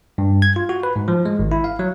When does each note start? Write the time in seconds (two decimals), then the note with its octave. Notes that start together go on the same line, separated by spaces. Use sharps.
0.18 G2
0.42 G#6
0.56 F4
0.69 F#4
0.83 B4
0.96 G#2
1.08 F3
1.26 G#3
1.39 G#1
1.52 E4
1.64 F5
1.79 F#3